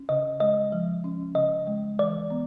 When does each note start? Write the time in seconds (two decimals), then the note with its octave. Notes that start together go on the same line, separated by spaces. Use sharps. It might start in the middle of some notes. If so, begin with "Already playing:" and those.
Already playing: C#4
0.09 C#3 D#5
0.40 G#3 D#5
0.72 F3
1.04 C#4
1.35 C#3 D#5
1.67 G#3
1.99 E3 D5
2.30 B3